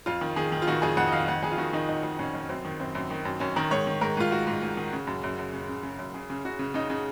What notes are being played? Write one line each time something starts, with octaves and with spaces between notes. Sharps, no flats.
F2 F4
D#3
D#3 G#4
D#3
F4
D#3 F#4
F2 G#4
F2 F#5
D#5
D#3 F5
F2 F#5
F2 G#4
F4
D#3 F#4
D#3 D#4
F2 D#4
F2
F2 C#4
F2
F#2 C4
D#3
F#2 C4
F#2
D#3
F#2
F#2 C#4
D#3 A#4
G#2 C#5
D#3
G#2 A#4
G#2 F4
G#2 F#4
G#2
G#2
D#3
C#3
F#2
F#2
F#2
C#3
C#3
C#3
F#2
C#3 G#4
C#3
C#3 F#4
C#3
C#3 D#4
C#3